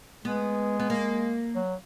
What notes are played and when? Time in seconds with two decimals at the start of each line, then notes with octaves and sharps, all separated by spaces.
0.25 G#3 B3
0.80 B3
0.90 A#3
1.55 F#3